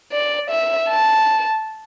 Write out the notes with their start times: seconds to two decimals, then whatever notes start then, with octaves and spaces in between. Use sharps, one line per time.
0.12 D5
0.50 E5
0.90 A5